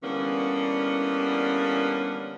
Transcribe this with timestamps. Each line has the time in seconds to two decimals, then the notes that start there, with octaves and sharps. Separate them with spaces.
0.04 D3 E3 G3 A#3 B3 C#4